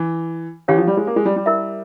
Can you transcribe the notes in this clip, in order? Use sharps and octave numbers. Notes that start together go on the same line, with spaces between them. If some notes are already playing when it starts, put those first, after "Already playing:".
Already playing: E3
E3 C#4 G4 C#5 F5
F3
G3
G#3
A#3
G#3
G3
G3
E4 A#4 E5